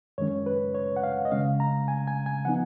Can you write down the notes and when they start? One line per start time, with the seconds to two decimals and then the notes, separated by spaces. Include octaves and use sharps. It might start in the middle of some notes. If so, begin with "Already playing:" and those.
0.18 F#2 D#3 G#3 C#4 C#5
0.46 B4
0.75 C#5
0.96 F#5
1.03 F5
1.25 D#5
1.31 C#3 G#3 C#4 F5
1.60 A#5
1.88 G#5
2.07 G#5
2.26 G#5
2.45 F3 B3 D#4 F#5